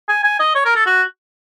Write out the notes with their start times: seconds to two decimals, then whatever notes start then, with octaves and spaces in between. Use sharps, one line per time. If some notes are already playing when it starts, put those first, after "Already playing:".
0.09 G#5
0.24 G#5
0.39 D#5
0.55 C#5
0.65 A#4
0.76 A4
0.86 F#4